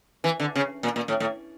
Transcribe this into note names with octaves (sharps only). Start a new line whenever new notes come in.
E3
D3
C#3
A#2
A#2
A2
A2